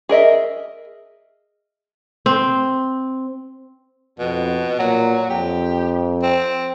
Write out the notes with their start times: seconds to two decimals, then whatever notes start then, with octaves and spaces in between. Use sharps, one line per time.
0.09 G#4 A#4 D#5 E5
2.26 C4
4.19 F2 B2
4.79 A#2 F#3
5.30 F2 G4
6.23 C4